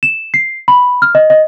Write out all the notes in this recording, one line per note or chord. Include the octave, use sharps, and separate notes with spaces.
E7
C7
B5
F6
D#5
D#5